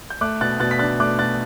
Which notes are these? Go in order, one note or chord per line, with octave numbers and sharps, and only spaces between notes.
G6
A3 D6 F#6
B2 F#6 A6
B2 F#6 A6
B6
D4 F#6 A6
A3 D6 F#6
B2 F#6 A6